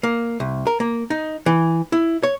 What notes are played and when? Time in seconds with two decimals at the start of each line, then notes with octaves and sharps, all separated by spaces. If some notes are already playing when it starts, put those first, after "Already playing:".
0.03 A#3
0.40 C2
0.67 A#4
0.80 A#3
1.10 D#4
1.46 E3
1.92 E4
2.23 C#5